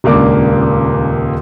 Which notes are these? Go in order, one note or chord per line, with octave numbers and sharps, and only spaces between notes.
D#1 C#2 A#3 D4 D6